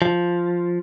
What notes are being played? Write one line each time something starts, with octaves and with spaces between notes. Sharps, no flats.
F3